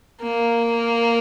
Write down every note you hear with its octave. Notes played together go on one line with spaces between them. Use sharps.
A#3